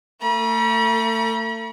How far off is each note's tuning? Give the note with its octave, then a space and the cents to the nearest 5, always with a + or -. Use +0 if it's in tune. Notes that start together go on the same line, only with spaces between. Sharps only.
A3 +35 B5 -45